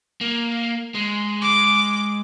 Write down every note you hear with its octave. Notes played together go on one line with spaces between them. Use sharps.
A#3
G#3
D6